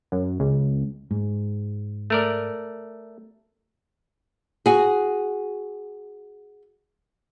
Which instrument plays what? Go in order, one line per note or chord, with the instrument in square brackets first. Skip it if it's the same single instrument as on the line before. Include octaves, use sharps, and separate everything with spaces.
[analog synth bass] F#2
C#2
[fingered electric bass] G#2
[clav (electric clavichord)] A3 A#4 D5
[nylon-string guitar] F#4 G#4